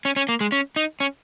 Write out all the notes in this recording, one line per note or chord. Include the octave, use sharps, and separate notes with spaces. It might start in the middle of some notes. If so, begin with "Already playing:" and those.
C#4
C#4
A#3
G#3
C#4
D#4
C#4